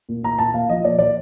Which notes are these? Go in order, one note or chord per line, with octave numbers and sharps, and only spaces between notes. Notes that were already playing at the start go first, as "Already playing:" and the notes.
A#2
A#2 A#5
A#2 A5
A#2 F5
F3 D#5
A#2 D5
A#2 D5